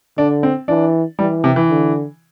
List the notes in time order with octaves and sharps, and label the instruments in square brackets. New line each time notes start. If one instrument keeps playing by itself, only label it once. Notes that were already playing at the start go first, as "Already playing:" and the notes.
[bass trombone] D3 [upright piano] D4
[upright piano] C4
[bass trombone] E3 [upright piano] D4
[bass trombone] E3 [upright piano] G3
[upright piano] C3
E3
[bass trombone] D3